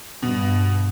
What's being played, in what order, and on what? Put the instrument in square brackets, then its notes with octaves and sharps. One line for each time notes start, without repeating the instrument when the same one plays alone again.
[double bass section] G2 [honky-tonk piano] B2